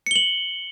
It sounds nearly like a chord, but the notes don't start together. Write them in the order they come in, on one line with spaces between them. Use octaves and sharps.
C#7 G7 F#7